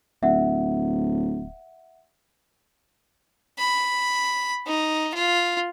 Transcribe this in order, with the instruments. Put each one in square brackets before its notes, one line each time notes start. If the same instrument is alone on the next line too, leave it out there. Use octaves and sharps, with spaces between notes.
[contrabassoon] D1 [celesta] E5 F#5
[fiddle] B5
D#4
F4